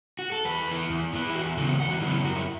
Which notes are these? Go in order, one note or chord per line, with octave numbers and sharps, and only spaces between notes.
F#4
A4
E2 B4
E3 B3
E2
E3 B3
E4
E2 F#4
C#3 F#3 B3 A4
E2 F#5
F#4
C#3 F#3 B3 E4
E4
F#2 F#4
E4